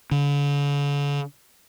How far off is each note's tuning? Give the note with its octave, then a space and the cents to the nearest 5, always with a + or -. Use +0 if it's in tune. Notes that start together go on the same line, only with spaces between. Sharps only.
D3 -45